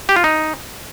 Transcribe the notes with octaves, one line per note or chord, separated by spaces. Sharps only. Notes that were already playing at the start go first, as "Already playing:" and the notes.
G4
F4
D#4